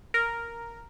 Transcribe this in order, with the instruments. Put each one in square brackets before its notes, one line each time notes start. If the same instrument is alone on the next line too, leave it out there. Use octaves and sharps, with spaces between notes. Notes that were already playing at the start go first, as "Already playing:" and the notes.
[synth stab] A#4